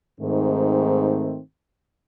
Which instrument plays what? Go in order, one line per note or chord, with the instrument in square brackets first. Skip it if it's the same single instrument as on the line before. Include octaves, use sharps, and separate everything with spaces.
[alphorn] G#2 [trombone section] D#3 A3 C4